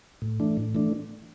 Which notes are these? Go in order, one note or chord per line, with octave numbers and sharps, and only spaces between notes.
A2
E3 A3 D4
A2
E3 A3 D4